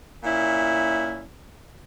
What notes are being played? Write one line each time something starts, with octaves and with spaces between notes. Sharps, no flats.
A#2 C#4 E4